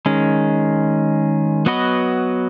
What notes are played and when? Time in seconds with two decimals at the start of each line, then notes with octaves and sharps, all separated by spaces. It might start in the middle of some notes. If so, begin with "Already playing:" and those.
0.06 D#3 G#3 C#4
1.66 F#3 B3 F#4 B4 D#5